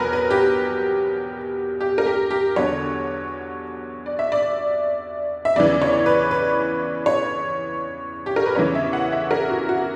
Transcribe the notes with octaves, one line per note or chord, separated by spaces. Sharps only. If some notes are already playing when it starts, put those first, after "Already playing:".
Already playing: E2 B2 F#3 A#4 B4
B4
G4
G4
A#4
G4
G4
E2 D3 F#3 C#5
D5
E5
D5
E5
E2 C#3 E3 D5
C#5
B4
B4
C#5
G4
A#4
B4
E2 C#3 E3 C#5
E5
F#5
E5
A#4
F#4
F#4